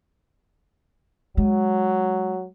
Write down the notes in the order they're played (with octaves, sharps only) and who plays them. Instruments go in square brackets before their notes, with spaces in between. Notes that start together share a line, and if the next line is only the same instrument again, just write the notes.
[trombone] F#3 [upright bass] G#3